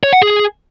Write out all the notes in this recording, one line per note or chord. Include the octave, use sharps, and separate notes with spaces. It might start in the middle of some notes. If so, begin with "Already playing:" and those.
C#5
F#5
G#4